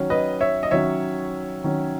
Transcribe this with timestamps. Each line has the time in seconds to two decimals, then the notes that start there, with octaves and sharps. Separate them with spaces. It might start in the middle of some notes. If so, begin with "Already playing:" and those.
Already playing: D#3 F#3 C#4
0.10 B4 D#5
0.41 C#5 E5
0.63 D#5
0.71 D#3 F#3 C#4 C#5 E5
1.64 D#3 F#3 C#4